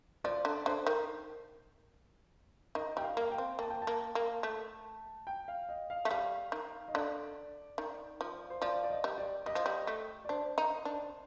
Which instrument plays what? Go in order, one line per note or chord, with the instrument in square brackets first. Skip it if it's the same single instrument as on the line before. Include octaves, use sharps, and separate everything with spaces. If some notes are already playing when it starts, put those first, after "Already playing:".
[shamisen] F3 [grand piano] D5
[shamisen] D3
[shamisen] D3 [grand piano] C5
[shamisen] D#3
[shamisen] D#3 [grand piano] D#5
[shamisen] G3 [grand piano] G5
[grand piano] F5
[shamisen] A#3 [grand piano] F5
[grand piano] G5
[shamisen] C4
[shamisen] A#3 [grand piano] A5
[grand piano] G5
A5
[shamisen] A#3
A#3
A3
[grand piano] G5
F5
D#5
F5
[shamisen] A3
[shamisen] G3 [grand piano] F5
[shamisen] D#3
[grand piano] D#5
[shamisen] D3 [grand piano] D5
[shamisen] D#3
F3
[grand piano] C5
[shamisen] F3 [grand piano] D5
[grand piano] D5
D#5
[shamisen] G3
[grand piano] D5
[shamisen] G3 [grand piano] D#5
[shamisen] F3
G3
A3
[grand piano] D5
[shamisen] D4 [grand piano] C5
[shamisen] D#4
D4